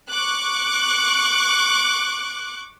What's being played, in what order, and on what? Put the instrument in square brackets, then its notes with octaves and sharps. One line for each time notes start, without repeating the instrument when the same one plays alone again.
[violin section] C#6 D6 F#6